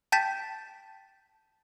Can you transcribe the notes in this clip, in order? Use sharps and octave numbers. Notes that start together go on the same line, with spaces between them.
G5 A5 G6 A6 B6 E7